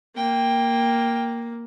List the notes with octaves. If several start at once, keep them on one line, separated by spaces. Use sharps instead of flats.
A#3 G5